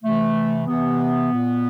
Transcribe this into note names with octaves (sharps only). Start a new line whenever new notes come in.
C3 E3 A3
C3 E3 B3
A#2